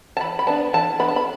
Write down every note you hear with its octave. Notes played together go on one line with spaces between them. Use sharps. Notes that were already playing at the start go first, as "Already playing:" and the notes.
A5
E3 B5
B5
B3 D4 A5
E3 A5
B3 D4 B5
A5
B5